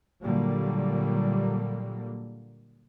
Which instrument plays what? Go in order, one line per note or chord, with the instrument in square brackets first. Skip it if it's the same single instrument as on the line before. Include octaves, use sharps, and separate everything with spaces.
[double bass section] A#2 D3 F#3 G3 A#3